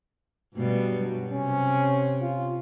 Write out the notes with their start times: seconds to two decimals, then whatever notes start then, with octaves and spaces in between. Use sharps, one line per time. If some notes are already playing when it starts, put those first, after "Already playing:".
0.55 G2 B2 G3
0.89 F#3
1.31 C3 C#4
2.21 F4